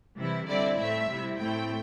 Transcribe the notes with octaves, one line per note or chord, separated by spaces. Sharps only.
C3 E3 G3 E4
D3 G3 C4 E4 D5
A2 A3 C4 E5
C3 G3 E4
A2 A3 C4 E4 G5